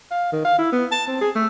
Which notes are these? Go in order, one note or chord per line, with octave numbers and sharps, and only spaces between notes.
F5
D#3
F5
E4
B3
A5
C4
G#4
A3